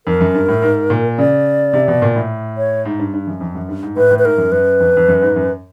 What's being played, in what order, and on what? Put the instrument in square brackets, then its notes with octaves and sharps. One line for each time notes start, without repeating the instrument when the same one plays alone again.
[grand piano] F2 [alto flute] A#4
[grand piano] F#2
G2
A2
G#2
A#2
[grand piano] C#3 [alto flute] D5
[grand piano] C3
B2
A#2
A2
[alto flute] C#5
[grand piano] G#2
G2
G2
F#2
F2
F#2
G2
G#2
[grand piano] A2 [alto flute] B4
[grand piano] A2
[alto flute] B4
[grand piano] G#2 [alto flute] A#4
[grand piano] F#2
[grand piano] F#2 [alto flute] B4
[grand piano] F2
F2
F#2
G#2
F#2